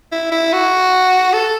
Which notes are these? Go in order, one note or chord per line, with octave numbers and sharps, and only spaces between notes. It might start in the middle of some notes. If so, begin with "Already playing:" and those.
E4
E4
F#4
A4